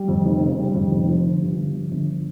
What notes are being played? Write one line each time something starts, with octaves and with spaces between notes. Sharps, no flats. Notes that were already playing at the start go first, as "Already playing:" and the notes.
Already playing: G3
F2
F1
C#3
G3
F2
F1
F3
G1
G2
G1
F3
G1